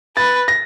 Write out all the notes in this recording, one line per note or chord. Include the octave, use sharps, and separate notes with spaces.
B4 A6
A#6